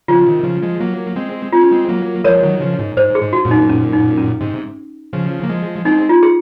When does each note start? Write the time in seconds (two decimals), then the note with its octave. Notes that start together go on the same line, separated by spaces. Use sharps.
0.08 C#3 F3 F4
0.26 C3 D#3
0.44 C#3 F3
0.62 F3 G#3
0.80 F#3 A#3
1.16 G#3 C4
1.52 C4 F4
1.62 C#4
1.71 G#3 C4
1.89 F#3 A#3
2.24 F3 G#3 A#4 C#5
2.42 D#3 F#3
2.60 C#3 F3
2.79 G#2
2.97 G#2 C5
3.15 G#4
3.21 G#2
3.33 F#4
3.45 F#2 A#2
3.51 D#4
3.69 C#4
3.93 D#4
4.18 C#4
4.41 G#2 C3
5.13 C#3 F3
5.43 A#3
5.49 F3 G#3
5.85 G#3 C4 D#4
6.09 F4
6.23 G#4